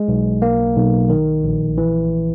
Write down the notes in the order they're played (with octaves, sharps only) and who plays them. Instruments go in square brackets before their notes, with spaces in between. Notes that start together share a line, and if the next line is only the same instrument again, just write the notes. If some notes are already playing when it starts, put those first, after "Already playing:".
Already playing: [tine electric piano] G#3
B1
A#3
B1
D#3
A#1
E3